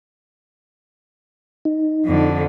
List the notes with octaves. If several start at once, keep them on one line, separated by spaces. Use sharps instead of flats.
D#4
F2 D3